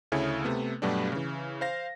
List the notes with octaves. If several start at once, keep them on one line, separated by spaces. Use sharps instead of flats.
D2 C#3 E4 G#4 A4 C#5
C3 A3 B3
G2 B2 F#3 G3 A3 D4
C#3 E3
C5 F5 A#6